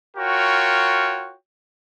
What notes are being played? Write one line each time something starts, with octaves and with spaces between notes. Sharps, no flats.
F4 F#4 A#4 C#5 G5